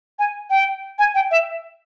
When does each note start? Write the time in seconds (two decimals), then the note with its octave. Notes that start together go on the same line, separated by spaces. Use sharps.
0.19 G#5
0.50 G5
0.99 G#5
1.15 G5
1.31 E5